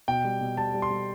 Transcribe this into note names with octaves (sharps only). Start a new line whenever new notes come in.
B2 G5
G3
B2
G3 A5
G3
C6
G3